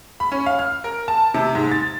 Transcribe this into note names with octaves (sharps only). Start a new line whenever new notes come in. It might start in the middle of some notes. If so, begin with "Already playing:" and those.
B5
C#4
F5
F6
A#4
A5
C3
G#2
A6